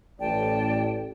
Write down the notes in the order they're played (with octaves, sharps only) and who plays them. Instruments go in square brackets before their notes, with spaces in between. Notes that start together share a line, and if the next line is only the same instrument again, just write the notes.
[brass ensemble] A1 [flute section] D5 G5 A5